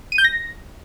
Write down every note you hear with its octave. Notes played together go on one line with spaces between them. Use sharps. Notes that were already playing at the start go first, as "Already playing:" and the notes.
D#7
G6
A#6